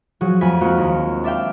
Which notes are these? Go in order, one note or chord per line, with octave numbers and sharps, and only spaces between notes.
F3 F#3 F#4 G#4
F2 A3 G#5 B5 B6
F3 G#3 A#3 C4 F4 F#4
D#2
D4 D5 E5 F5 G5